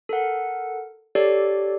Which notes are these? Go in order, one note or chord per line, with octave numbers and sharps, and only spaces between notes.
A4 A#4 F#5
G4 A4 C#5 D5